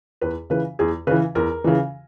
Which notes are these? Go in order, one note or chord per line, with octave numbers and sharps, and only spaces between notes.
E2 B4
C#3 E3 B4
E2 G#4
C#3 E3 B4
E2 A#4
C#3 E3